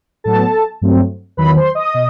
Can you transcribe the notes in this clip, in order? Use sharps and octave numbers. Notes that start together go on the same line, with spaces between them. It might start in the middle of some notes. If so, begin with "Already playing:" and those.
A2 F#3 B3 A4 A5
G2 F#3 A3 C4
E2 D#3 F#3 B4 B5
C5 C6
D#5 D#6
B2